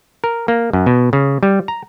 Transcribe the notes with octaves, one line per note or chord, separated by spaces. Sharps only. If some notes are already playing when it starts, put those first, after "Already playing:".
A#4
A#3
F#2
B2
C#3
G3
A#5